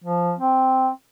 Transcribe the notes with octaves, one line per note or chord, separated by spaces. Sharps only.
F3
C4